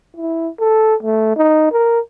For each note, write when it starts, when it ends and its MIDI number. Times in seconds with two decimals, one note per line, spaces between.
0.17 0.48 64
0.60 0.95 69
1.03 1.34 57
1.37 1.69 63
1.72 2.00 70